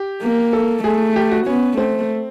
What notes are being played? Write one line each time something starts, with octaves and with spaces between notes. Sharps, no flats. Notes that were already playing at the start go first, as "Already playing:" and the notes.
Already playing: G4
A#3
A4
A3 G#4
G4
F#4
B3 C#4
A3 C4